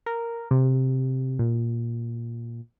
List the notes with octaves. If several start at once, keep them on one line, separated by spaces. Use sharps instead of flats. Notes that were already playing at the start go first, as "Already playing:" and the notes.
A#4
C3
A#2